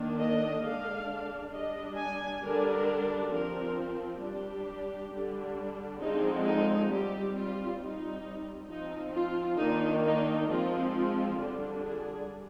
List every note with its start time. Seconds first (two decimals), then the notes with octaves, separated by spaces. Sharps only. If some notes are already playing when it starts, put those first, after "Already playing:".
Already playing: D#3 A#3 D4
0.19 D#5
0.63 D3 G#3 D4 F5
1.53 G3 D4 D#5
1.98 G#5
2.42 D3 G3 D4 A#4
3.32 F3 C4 A#4
4.22 G3 D4 G4
5.12 D3 G3 D4
6.00 D3 F3 G#3 C4 D#4
6.46 D#4
6.90 G3 C4 G4
7.36 F4
7.80 G3 C4 D#4
8.69 F3 C4 D#4
9.14 F4
9.60 D#3 A#3 D4 D#4
10.04 D#4
10.49 F3 G#3 C4 F4
10.94 F4
11.39 D3 G3 D4
11.84 G#4